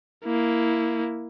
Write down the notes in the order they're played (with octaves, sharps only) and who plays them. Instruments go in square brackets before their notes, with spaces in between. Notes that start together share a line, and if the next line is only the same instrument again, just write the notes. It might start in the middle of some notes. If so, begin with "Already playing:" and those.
[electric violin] A#3 E4